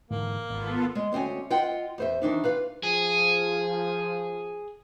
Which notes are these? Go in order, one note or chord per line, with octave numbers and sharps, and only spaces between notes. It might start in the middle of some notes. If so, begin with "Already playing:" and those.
G#2 D3 E3 A#3
G#1 B3 F4 A4
G#3
D2 C4 C#4 G#5
F4 D#5 F#5 G5
E2 C5 E5
D#3 E3 D4 D#4
F4 B4 F5
F3 G#4